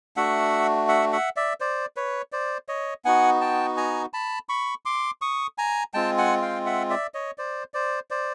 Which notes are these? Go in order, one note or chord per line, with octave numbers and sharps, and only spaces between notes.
A3 D4 F#4 E5 F#5
E5 F#5
E5 F#5
D5 E5
C5 D5
B4 C#5
C5 D5
C#5 D#5
B3 D#4 F#4 F#5 G#5
G5 A5
G#5 A#5
A5 B5
B5 C#6
C6 D6
C#6 D#6
G#5 A#5
G#3 C4 F4 G5 A5
F#5 G#5
F5 G5
E5 F#5
D5 E5
C#5 D#5
C5 D5
C5 D5
C5 D5